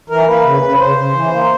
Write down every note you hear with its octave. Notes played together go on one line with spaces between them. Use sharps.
E3 A#4
A#3 B4
C#3
C#3
C#3 C5
C#3
E3
A#3